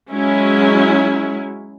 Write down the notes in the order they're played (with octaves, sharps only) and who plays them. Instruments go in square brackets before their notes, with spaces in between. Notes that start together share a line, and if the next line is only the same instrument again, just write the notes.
[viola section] F#3 G#3 C#4 E4